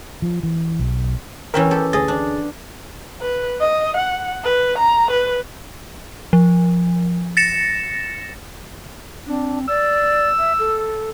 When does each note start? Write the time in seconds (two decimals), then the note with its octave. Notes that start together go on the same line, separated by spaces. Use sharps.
0.22 F3
0.43 E3
0.79 B1
1.54 E3 C#4 A#4 E5 G5
1.71 G4 A4
1.93 D2 G#4 D#5 A6
2.08 D4
3.21 B4
3.60 D#5
3.96 F#5
4.43 B4
4.78 A#5
5.10 B4
6.33 F3
7.37 A6 A#6 C#7 E7
9.27 C4 D4
9.68 D5 E6
10.39 E5
10.59 A4